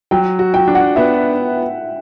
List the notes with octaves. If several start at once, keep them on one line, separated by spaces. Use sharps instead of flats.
F#3 G5
F#4
G5
D4
F#5
B3 E5